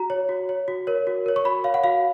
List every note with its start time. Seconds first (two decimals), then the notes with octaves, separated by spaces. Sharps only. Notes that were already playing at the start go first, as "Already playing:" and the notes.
Already playing: F#4 A#5
0.10 C#5
0.29 F#4
0.49 C#5
0.68 F#4
0.87 A#4 C#5
1.07 F#4
1.26 A#4 C#5
1.36 C#6
1.45 F#4 B5
1.64 C#5 F5
1.74 F#5
1.84 F#4 F5